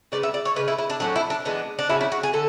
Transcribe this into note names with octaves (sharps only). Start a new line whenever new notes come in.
C#3 G#3 B3 D5
E5
D5
C#5
C#3 E3 G#3 B4
E4
E4
D4
A2 F#3 C#4 D4
E4
D4
E3 G#3 B3 D4
D4
C#3 F#3 C#4 E4
E4
F#4
G#4
D3 A4